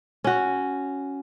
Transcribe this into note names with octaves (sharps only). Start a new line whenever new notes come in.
C#4 F#4